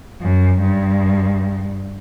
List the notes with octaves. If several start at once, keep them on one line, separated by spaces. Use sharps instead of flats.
F#2
G2